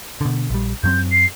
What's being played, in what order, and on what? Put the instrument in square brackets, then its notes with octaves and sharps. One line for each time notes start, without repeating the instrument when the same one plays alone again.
[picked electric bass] B2 D3
A#1 G3
[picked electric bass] F#2 F#3 C4 [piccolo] G6
[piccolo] C7